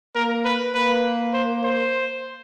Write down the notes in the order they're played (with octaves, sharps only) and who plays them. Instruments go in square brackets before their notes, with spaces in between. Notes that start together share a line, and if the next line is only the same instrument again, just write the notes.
[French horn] A#3 [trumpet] A#4
[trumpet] B4
[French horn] A#3 [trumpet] B4
[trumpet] C5
C5